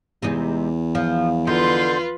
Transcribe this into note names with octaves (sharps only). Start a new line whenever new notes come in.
E2 C3 G#3 D#4
F3
D3 D#4 F4 B4 C6 G6